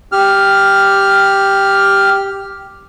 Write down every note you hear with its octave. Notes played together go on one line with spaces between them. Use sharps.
G4 F6